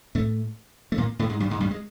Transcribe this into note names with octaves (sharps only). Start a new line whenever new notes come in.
A2 A3
A3
A#2 A#3
A2 A3
G#2 G#3
G2 G3
G#2 G#3
G2 G3
G#3